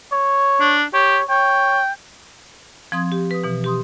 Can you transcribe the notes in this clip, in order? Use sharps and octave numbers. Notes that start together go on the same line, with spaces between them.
C#5
D4
G4 C#5
C#5 G5
F3 C4 C6 D#6 G#6
G4
B4 D#6
B2 E3
G4 C6 D#6